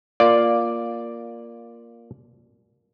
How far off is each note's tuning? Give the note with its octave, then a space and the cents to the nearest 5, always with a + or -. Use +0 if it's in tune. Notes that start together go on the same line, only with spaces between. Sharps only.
A#3 +5 F4 +0 D5 +0